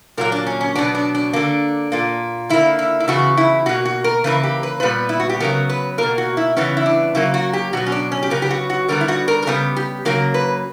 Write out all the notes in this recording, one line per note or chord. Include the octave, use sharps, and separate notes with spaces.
A#2 F#3 A#3 A#4
D4
C#4
C#4
B2 F#3 B3 D4
D4
D4
D3 A#3 D4
A#2 A#3
D3 A#3 E4
E4
E4
C#3 E3 B3 F#4
E4
B2 A#3 F#4
F#4
A#4
C#3 E3 A#3 B4
G4
B4
A#2 G3 B3 B4
E4
F#4
G4
C#3 F#3 B3 A#4
B4
B2 A#3 A#4
F#4
E4
C#3 E3 G3 B3 C#4
E4
D4
C#3 F#3 A#3 E4
F#4
G4
B2 F#3 B3 F#4
C#4
D4
C#4
G4
C#3 F#3 B3 A#4
G4
F#4
F#4
D3 G3 B3 A#4
E4
F#4
A#4
A#4
C#3 G3 B3 G4
G4
C#3 F#3 A#3 A#4
B4